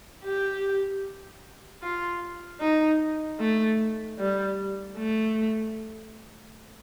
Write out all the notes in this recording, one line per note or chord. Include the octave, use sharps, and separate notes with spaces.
G4
F4
D#4
A3
G3
A3